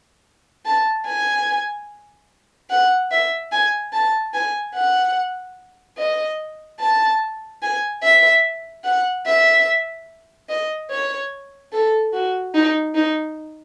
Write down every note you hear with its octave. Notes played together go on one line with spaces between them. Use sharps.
A5
G#5
F#5
E5
G#5
A5
G#5
F#5
D#5
A5
G#5
E5
F#5
E5
D#5
C#5
A4
F#4
D#4
D#4